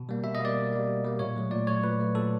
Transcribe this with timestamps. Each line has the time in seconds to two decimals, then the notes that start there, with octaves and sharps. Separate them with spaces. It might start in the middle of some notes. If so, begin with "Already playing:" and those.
Already playing: B2
0.09 G3 A#3
0.24 B2 E5
0.35 D#5
0.40 G3 A#3 D5
0.57 B2
0.72 G3 A#3
0.87 B2
1.05 G3 A#3
1.19 A#2 C#5
1.36 F#3 A3
1.51 A#2 D5
1.67 F#3 A3 C#5
1.84 A#2 B4
2.00 F#3 A3
2.15 A#2 A4